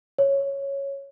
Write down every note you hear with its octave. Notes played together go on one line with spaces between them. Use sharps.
C#5